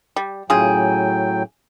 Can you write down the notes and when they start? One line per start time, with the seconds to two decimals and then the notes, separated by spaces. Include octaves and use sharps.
0.16 G3
0.50 A2 C#3 F#3 F4 G#4 G5